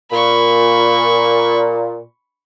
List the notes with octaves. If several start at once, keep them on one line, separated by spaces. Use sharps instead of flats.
A#2 B5 C#6